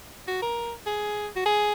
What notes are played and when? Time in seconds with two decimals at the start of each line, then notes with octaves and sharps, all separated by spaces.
0.28 F#4
0.42 A#4
0.86 G#4
1.36 F#4
1.46 G#4